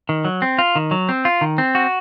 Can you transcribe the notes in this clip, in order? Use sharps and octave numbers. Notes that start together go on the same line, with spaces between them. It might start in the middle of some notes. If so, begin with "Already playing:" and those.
D#3
F#3
C4
F4
D#3
F#3
C4
F4
D#3
C4
F#4